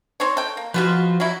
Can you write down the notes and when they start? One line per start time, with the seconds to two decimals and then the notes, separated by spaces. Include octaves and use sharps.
0.20 C4 D#4 C#5
0.37 A4 G5
0.57 A#3
0.74 F3 G#3 B3 F4 F#4 B4
1.20 F#3 G3 E4